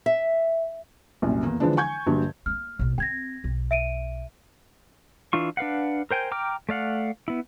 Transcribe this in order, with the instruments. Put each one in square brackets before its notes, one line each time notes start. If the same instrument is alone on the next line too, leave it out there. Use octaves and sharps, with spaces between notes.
[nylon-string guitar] E5
[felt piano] C2 F#2 A#2
E2 A#3
D3 E3 F3 G#3 D4
G#5 C#6 G6 G#6
A#1 G2 D3 F#3
[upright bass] A3 A#3 [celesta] F6
[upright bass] A#1 B2
[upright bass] C4 [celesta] G5 G#6 A#6
[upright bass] B1
[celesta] E5 D7 D#7
[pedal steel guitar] E3 D4 F4 C#6
D4 B4 F5 F#5
A#4 C5 G5 G#5
G5 A#5 D6 F6
A3 D5 F5 F#5
B3 E4